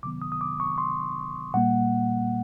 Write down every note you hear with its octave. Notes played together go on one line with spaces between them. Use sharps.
C3 D#3 F#3 B3 D6
D#6
D#6
D6
C#6
C6
A#2 G3 A#3 F#5